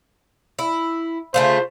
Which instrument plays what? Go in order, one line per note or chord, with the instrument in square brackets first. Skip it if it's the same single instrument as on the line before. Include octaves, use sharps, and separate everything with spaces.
[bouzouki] E4
[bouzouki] C#3 A3 F4 [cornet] C5